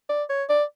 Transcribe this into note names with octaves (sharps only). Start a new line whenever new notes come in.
D5
C#5
D5